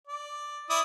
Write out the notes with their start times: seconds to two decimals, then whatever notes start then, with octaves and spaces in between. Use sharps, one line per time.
0.07 D5
0.70 E4 D5 D#6